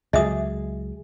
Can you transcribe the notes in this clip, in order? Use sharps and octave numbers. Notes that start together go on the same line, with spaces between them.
C#2 F#3 G#4 D#5 E5 D#6